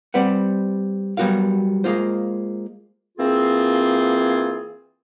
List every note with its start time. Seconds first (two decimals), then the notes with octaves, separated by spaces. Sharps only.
0.14 G3 C4 B4 F#5
1.17 F#3 G3 B3 F#4 A#4 F5
1.84 G#3 A#3 F4 C5
3.18 E3 A#3 C4 F4 G#4